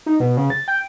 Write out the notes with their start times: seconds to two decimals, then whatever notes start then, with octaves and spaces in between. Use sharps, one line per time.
0.06 D#4
0.20 B2
0.37 C#3
0.50 A6
0.68 G5